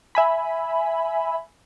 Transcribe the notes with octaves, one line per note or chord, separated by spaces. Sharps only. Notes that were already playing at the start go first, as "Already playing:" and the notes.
E5 G#5 B5